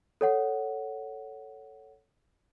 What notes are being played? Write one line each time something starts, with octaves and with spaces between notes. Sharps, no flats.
A4 C#5 F#5